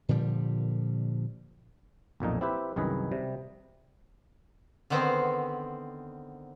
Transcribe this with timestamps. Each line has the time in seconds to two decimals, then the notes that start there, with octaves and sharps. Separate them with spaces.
0.09 A#2 D3 F3 G3
2.20 B1 F2 A#2 D#4
2.41 C4 E4 G4 B4
2.76 C2 F#2 D#3 G#4 B4
3.11 C3 G3
4.90 D3 D#3 B3 C4 C5